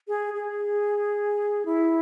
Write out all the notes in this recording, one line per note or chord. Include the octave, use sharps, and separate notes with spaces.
G#4
G#4
E4